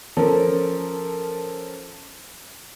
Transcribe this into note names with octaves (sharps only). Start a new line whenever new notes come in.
F3 C#4 A4 A#4